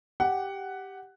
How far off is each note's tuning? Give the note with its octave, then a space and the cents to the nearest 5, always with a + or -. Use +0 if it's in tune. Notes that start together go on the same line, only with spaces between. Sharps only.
G4 +0 F#5 +10